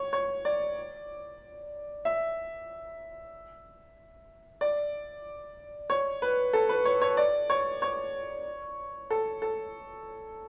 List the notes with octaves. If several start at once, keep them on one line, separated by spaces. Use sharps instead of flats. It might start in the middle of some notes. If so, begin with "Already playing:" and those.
Already playing: C#5
C#5
D5
E5
D5
C#5
B4
A4
B4
C#5
C#5
D5
C#5
C#5
A4
A4